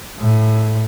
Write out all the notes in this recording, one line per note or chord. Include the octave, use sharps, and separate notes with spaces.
A2